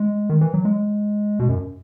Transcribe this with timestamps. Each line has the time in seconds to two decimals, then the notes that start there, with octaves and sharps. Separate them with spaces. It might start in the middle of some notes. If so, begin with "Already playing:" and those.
Already playing: G#3
0.29 D#3
0.41 E3
0.54 F#3
0.65 G#3
1.39 B2
1.49 F#2